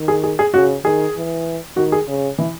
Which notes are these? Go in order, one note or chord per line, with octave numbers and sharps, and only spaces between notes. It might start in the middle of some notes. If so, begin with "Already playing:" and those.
Already playing: D#3
G#4
G#4
G#4
C#3 F#4
D#3 G#4
E3
D#3 F#4
G#4
C#3
E3